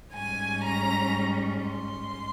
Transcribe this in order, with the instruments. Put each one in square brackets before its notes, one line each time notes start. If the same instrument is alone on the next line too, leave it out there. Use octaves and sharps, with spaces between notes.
[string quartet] G#2 G3 C#4 G#5
A#5
C6